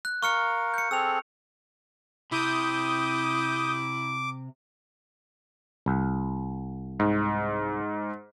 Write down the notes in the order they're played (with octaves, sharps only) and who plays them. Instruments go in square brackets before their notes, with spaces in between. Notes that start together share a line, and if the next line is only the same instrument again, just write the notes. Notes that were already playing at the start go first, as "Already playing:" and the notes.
[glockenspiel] F#6
[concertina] A#4 F5 [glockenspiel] C#6 F6 C#7
[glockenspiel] G6 C#7
[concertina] C4 G#4 A4 [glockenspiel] E6 F7
[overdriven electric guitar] C3 [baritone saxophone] E4 [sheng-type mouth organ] D6 [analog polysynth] D#6 G6
[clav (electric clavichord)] C2
[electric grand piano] G#2